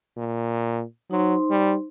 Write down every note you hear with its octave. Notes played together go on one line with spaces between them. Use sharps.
A#2
F#3 D#4 C5 C6
G3